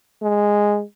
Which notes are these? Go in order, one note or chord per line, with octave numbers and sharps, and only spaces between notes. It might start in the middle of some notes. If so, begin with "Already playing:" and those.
G#3